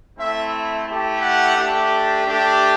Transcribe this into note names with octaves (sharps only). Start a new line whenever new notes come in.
A3 C4 E4 E5
A3 E4 G4
F#5
A3 D4 G4
A3 D4 G4